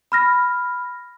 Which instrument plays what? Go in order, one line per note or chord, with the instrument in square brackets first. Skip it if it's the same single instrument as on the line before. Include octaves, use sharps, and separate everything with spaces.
[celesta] B5 F6 A#6